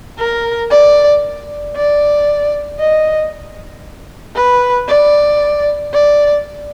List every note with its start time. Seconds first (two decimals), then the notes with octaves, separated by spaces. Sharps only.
0.19 A#4
0.71 D5
1.76 D5
2.79 D#5
4.36 B4
4.88 D5
5.94 D5